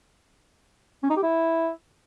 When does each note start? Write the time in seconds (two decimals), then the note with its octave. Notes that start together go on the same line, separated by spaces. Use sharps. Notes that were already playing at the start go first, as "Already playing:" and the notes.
1.03 C#4
1.10 D#4
1.16 G4
1.23 E4